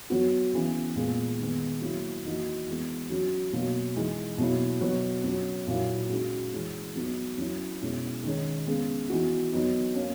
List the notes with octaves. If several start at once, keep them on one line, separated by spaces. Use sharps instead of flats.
F#3 B3 F#4
C#3 E3 B3
A#2 G#3 B3
D#3 G#3 B3
F#3 A#3 E4
E3 A#3 D#4 F#4
E3 G#3 B3
F#3 C#4 F#4
B2 F#3 A#3
E3 G#3 D#4
B2 F#3 A#3 E4
B2 F#3 B3 F#4
F#3 C#4 F#4
A#2 F#3 A#3 E4
C#3 G#3 D#4 F#4
E3 G#3 C#4
F#3 B3 D#4 F#4
F#3 C#4 E4
B2 G#3 C#4 E4
D#3 G#3 C#4
C#3 G#3 B3
E3 B3 D#4 F#4
F#3 B3 D#4 F#4
A#3 C#4